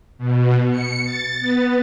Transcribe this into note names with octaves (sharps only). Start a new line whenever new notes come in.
B2
C#7
A6
B3